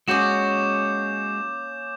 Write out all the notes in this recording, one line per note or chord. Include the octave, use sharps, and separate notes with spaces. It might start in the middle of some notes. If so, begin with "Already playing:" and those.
G#3 A#3 C#4 F#4 C#5 D6 G6 E7